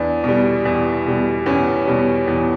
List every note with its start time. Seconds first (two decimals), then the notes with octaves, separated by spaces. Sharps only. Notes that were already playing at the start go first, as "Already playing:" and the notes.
Already playing: E2 D4
0.24 B2 G3
0.65 E2
1.06 B2 G3
1.46 E2 C#4
1.87 B2 G3
2.28 E2